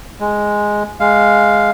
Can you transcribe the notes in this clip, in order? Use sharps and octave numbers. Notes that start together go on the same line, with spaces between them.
G#3
G#3 F5